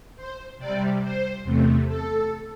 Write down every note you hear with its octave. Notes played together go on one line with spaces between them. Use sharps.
C5
C3 G3 D5
C5
E2 C3 A3
A4